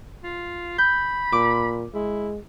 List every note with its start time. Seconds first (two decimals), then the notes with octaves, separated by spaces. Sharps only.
0.24 F4
0.78 B5 G6
1.32 A#2 D6
1.94 G#3 E4